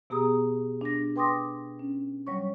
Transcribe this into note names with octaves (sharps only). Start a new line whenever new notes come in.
B2 B3 G4 G#4 A#5 D#6
D4 A#6
B4 G5 C6 D6 D#6 A#6
C#4
F#3 G3 C#5 C#6